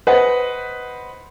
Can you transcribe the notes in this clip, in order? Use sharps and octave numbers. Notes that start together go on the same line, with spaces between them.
B4 C5 D#5 F#5